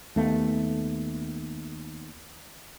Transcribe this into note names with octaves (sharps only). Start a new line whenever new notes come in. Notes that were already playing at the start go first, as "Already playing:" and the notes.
D#2 A3 B3